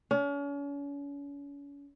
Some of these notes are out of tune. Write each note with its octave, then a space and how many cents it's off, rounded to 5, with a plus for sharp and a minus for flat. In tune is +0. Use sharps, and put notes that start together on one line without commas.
C#4 +40